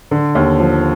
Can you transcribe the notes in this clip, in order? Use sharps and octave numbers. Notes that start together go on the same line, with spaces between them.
D3
D#2
F3